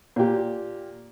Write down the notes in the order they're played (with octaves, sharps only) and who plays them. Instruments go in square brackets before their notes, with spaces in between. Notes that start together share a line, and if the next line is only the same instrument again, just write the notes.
[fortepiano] A#2 G4